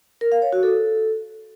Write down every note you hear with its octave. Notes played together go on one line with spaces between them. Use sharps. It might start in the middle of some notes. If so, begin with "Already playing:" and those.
A#4
F5
C#5
F#4
A4